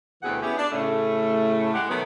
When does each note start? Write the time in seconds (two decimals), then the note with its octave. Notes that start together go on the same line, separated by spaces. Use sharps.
0.23 D2 B2 E3 C4 G#4 F#5
0.42 B3 C#4 E4 G4 G#4
0.57 D4
0.71 A2 C#3 A3
1.74 A2 G#3 G4 F#5
1.88 B2 D#3 F#3 A3 B3